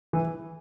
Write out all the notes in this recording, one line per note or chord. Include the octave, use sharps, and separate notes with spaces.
E3